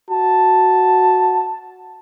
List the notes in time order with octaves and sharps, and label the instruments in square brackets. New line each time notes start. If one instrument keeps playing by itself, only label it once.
[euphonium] F#4 [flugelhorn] A5